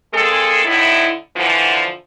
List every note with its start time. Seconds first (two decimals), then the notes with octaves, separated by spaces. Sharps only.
0.14 G#3 A#3 C4 G#4 A4
0.65 A2 D3 D#4 E4
1.36 D3 E3 F3